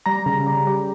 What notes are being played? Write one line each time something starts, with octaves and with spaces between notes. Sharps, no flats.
G3 A#5
C#3
G3
G3